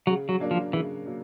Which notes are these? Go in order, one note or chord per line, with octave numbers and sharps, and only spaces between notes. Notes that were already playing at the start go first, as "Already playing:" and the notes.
C#3 F#3
F#3
F#3 A#3 D4
F3
C#3 E3
F#3 A#3